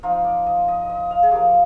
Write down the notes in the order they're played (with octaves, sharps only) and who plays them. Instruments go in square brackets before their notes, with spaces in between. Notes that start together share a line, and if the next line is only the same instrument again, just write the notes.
[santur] F3 C4 D#4 F4
D5
D#5
D#5
D#5
F5
G#4
F3 A#3 F4 G4